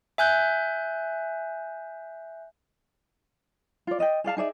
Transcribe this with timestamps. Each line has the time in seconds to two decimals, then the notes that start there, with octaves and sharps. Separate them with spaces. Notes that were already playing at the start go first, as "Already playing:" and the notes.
0.18 E5 G#5 F#6 G6
3.87 F4 D5
3.99 D5 D#5 F5 G5
4.24 G#4 D5 F5 A5
4.37 D#4 G#4 D5 E5